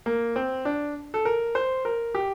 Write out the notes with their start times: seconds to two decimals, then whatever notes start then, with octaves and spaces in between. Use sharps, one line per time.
0.06 A#3
0.36 C4
0.65 D4
1.14 A4
1.25 A#4
1.55 C5
1.85 A#4
2.15 G4